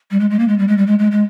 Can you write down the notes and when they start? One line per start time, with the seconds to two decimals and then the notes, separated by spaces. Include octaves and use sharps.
0.10 G3
0.19 G#3
0.30 G#3
0.39 A#3
0.48 G#3
0.58 G3
0.67 G#3
0.77 G3
0.86 G#3
0.99 G#3
1.11 G#3